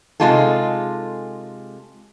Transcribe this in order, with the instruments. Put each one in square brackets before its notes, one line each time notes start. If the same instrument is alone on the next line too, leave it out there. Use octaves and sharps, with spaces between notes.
[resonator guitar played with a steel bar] C3 G#3 D#4 F4 G#4 A4